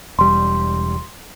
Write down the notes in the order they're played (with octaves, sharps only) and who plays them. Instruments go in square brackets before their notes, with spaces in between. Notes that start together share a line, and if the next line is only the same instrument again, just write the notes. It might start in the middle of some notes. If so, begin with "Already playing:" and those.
[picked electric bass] E1 G3 [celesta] C6